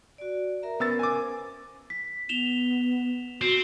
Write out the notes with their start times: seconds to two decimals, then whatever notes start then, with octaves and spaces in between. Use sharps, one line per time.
0.18 F#4 D5
0.63 A#4 E5 A#5
0.80 B3 C#4 A#4 C5 E6 A6
0.99 G#5 D6
1.90 B6
2.29 B3 E7 F7 G7
3.41 C4 F#4